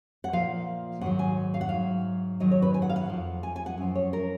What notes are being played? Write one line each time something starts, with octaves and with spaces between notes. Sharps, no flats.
F#5
A#2 F3 F5
G#2 D#3 F#3 F#5
G#5
F5
F#5
G#2 F#3 F5
G#2 D#3 F#3 D#5
C#5
B4
G#5
F#5
F5
F#5
F2 F3
G#5
G#5
F#5
F#2 F3
C#5
A#4